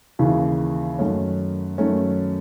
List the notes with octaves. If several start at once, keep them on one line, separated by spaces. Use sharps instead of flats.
D#2 C#3 E3
F#2 D#3 A3 C#4
F#2 D#3 A3 C#4